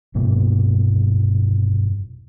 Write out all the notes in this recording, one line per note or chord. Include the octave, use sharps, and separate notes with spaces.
F1 G2 B2 A#3